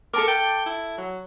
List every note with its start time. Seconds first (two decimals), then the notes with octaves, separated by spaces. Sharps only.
0.14 A4 A#4 A5 D6
0.28 G5
0.66 E4
0.98 F#3